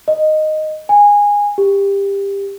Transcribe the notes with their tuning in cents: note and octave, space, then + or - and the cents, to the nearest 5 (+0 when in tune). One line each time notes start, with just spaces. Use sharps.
D#5 -5
G#5 -15
G4 +20